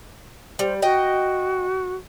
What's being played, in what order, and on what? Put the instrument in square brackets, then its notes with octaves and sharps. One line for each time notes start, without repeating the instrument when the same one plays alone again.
[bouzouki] G3 [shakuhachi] C5
[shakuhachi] F#4 [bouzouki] D#5 G5